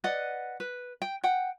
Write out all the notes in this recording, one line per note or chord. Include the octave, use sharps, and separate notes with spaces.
B4 D5 D#5 F#5
B4
G5
F#5 G5